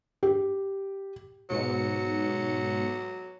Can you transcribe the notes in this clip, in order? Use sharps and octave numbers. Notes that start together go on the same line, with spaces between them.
G4
G#2 B2 F#3 C#7